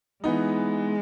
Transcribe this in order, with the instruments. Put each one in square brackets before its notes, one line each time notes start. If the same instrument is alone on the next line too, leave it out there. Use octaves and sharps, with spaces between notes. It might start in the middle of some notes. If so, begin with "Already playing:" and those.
[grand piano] E3 B3 D#4 [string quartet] G#3